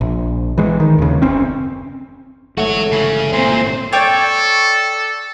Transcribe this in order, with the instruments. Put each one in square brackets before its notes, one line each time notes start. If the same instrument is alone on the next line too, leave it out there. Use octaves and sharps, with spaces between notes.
[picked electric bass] A#1
E3 G#3
D#3
D#2 C#3
F#1 C4 C#4
[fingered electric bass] G1 E3 G#3 [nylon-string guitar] A3 [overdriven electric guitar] F#4 C#5
[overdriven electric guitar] C#3
[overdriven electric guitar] A#2 [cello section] C4 C5
[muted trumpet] A4 [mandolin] C#5 D5 G5